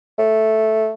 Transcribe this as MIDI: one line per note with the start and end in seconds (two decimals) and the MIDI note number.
0.19 0.91 57